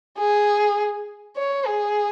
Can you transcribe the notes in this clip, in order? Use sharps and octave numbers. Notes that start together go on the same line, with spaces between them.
G#4
C#5
G#4